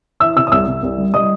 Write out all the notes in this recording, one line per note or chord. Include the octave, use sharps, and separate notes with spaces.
E3 E5 E6
C3 E5 E6
D#6
C2 E5 E6
C2
C2
G3
G3 D#5 D#6